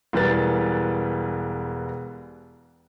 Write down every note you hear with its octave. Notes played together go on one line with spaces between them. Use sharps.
E1 E3 G3 A#4 B4 A6